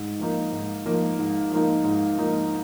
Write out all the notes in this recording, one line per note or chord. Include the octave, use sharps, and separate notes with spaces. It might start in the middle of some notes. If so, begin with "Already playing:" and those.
Already playing: G#2
F3 A#3 D#4
G#2
F3 A#3 D#4
G#2
F3 A#3 D#4
G#2
F3 A#3 D#4